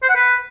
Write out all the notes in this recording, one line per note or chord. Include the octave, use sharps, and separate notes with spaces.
C5
F#5
B4